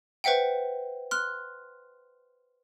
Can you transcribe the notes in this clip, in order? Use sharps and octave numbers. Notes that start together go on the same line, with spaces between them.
B4 C5 E5 F#5 G5
C6 F6 F#6